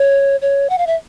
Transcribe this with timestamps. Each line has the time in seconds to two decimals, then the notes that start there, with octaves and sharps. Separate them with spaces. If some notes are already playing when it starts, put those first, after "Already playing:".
Already playing: C#5
0.42 C#5
0.70 F#5
0.78 F5
0.87 E5